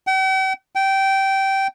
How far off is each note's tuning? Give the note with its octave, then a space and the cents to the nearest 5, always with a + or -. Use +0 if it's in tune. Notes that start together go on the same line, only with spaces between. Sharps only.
G5 -45
G5 -15